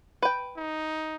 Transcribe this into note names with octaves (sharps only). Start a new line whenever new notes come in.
B4 G5
D#4